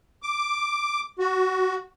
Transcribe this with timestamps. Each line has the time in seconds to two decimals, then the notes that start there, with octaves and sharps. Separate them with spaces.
0.23 D6
1.19 F#4